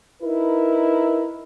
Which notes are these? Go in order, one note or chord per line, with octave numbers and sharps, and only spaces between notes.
D#4 E4 A#4 B4